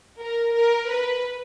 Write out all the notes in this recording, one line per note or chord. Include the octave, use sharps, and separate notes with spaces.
A#4
A#4
B4